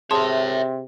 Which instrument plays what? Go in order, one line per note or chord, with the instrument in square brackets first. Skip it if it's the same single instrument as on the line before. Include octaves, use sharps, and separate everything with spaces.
[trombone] C3 [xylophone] G#4 A5 C6 [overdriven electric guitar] C#5 E5